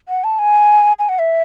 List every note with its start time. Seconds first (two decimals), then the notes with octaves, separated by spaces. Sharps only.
0.08 F#5
0.24 A5
0.39 G#5
0.99 G#5
1.09 F#5
1.19 E5